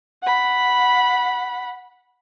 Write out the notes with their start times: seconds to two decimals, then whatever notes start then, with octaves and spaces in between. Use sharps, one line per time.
0.23 F#5 B5